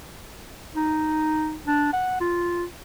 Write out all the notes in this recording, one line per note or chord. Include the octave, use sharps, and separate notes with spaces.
D#4
D4
F#5
F4